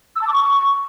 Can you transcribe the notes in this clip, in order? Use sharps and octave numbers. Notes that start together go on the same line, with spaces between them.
E6
A5
D6
C#6